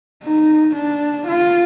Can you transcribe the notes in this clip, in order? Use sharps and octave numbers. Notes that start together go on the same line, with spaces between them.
D#4
D4
F4